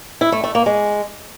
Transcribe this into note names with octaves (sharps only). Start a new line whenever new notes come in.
E4
A3
A3
A#3
G#3